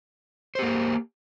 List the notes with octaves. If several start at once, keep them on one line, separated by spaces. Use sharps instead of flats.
A#3 G4 C5